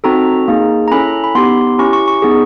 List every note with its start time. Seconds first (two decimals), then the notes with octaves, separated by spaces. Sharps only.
0.04 C4 D#4 F#4 A4 A#5
0.48 A#3 D#4 G#4
0.88 A#5
0.91 C#4 E4 A4 B5
1.24 B5
1.35 B3 D#4 G4 C6
1.78 C#4 E4 G4 C#6
1.93 C#6
2.08 C#6
2.22 B3 D#4 G#4